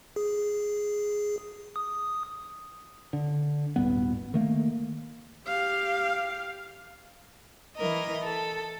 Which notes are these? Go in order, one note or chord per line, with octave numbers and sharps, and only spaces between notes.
G#4
D#6
D3
D#1 G#1 G2 B3
D#3 A3 A#3
G4 F5
E3 A#4 D#5
A4